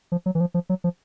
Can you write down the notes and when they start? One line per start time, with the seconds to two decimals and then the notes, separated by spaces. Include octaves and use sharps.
0.12 F3
0.26 F#3
0.35 E3
0.41 F3
0.54 F3
0.69 F#3
0.84 F3